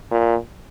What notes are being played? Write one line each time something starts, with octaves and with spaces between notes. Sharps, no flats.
A#2